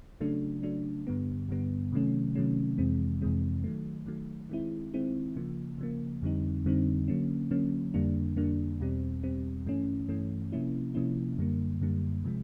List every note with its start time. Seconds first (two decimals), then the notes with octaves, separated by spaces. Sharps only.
0.21 C#3 F#3 A3 D4
0.63 C#3 F#3 A3 D4
1.07 G2 D3 G3 B3
1.49 G2 D3 G3 B3
1.92 C3 D#3 F#3 A3 C#4
2.35 C3 D#3 F#3 A3 C#4
2.78 F2 C3 E3 G#3 C4
3.22 F2 C3 E3 G#3 C4
3.64 D#3 F#3 A3
4.07 D#3 F#3 A3
4.49 D#3 G#3 C4 E4
4.94 D#3 G#3 C4 E4
5.36 C#3 F3 A#3
5.78 C#3 F3 A#3
6.22 F2 D3 G3 C4 D#4
6.65 F2 D3 G3 C4 D#4
7.08 D3 F#3 A#3 C#4
7.51 D3 F#3 A#3 C#4
7.94 F2 D3 G3 A#3 D4
8.37 F2 D3 G3 A#3 D4
8.80 E2 B2 G3 C4
9.23 E2 B2 G3 C4
9.66 G2 E3 A3 C#4
10.09 G2 E3 A3 C#4
10.52 C3 F3 A#3 C#4 E4
10.94 C3 F3 A#3 C#4 E4
11.38 F#2 D3 G3 A#3
11.81 F#2 D3 G3 A#3
12.24 C3 F3 G#3